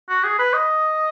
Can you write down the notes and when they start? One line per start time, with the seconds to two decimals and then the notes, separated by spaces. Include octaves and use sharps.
0.09 F#4
0.24 G#4
0.39 B4
0.54 D#5